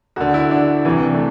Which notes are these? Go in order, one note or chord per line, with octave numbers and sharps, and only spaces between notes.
D2 D3 F#4
E4
D4
C2 C3 E3
A3